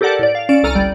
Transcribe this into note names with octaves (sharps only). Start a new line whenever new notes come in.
G4 A4 A#4 D5 F#5 A5
A2 D5
F5
C#4 D5 D7 E7
C2 A4 A#5 F6 D#7
G1 G3 D5